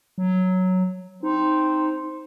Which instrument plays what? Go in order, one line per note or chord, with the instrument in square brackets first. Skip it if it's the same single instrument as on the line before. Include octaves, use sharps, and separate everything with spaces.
[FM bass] F#3
[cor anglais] C4 [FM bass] D#4